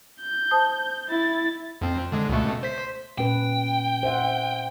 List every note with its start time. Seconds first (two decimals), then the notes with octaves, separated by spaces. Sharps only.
0.21 G6
0.51 C5 A5 D#6
1.09 E4 A6
1.81 F2 C4
2.12 D3 G#3
2.29 C#2 B2 A3
2.63 C5 B6
3.18 A#2 C#4 B4 G5
4.03 C5 E5 F#5